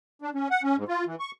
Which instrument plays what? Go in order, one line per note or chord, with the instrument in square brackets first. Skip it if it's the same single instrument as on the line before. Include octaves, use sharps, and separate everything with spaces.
[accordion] D4
C#4
F#5
C#4
G#2
F4
E3
C#6